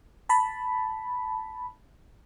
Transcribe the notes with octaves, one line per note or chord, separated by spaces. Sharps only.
A5 B5